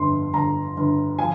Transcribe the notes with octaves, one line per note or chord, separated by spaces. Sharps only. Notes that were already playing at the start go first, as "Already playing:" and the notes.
Already playing: G1 F2 C6
G1 A#5
G1
F3 G#5